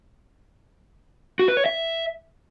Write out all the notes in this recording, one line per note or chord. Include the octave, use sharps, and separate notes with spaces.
F#4
B4
C#5
E5